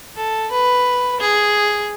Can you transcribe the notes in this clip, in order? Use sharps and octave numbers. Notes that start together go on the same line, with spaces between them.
A4
B4
G#4